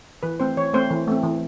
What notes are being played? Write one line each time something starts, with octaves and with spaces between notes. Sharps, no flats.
E3 B4
A3 C4 C5
E3 C#5
A3 C4 C5
E3
A3 C4
E3